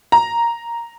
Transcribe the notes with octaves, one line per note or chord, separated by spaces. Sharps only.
A#5